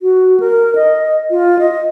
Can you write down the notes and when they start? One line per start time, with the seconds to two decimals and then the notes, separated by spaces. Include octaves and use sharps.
0.01 F#4
0.40 A#4
0.75 D#5
1.30 F4
1.59 D#5